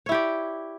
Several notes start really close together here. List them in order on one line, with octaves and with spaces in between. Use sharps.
C#5 E4 G4 D5